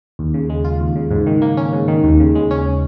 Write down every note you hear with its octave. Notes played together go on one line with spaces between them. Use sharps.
D#2
C#3
G#3
F4
D#2
C#3
G#2
D#3
A#3
C#4
G#2
D#3
D#2
C#3
G#3
C#4